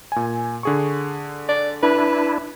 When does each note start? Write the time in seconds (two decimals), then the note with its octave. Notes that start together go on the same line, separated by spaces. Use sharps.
0.12 A#2 G#5
0.63 D3 G#4 C#6
1.49 D5
1.83 D4 E4 B4